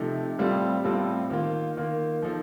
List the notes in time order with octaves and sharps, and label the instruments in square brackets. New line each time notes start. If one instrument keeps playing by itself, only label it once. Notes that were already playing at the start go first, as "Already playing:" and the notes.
Already playing: [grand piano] C3 F3 A3 D#4
A2 G3 C4 F4 A4
A2 G3 C4 F4 A4
D#3 A#3 F4
D#3 A#3 F4
F3 A#3 D#4 A4